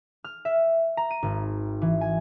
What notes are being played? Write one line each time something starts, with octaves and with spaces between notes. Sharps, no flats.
F6
E5
A#5
D#7
G#1
E3
G#5